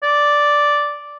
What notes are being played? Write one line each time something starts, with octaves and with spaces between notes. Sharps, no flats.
D5